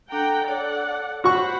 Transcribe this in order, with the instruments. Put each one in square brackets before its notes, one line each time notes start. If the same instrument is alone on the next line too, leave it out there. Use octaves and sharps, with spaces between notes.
[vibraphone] D4 A4 [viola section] F#5 G5 A#5
[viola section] A4 D5 F#5 [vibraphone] C#5
[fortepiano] F#4 C#6 [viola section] C5 F#5 B5